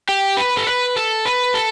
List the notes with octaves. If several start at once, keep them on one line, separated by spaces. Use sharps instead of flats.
G4
B4
A4
B4
A4
B4
A4